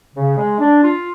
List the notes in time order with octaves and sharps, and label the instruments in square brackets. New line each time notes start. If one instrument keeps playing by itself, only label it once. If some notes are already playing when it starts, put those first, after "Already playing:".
[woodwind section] C#3
G#3
D4
F4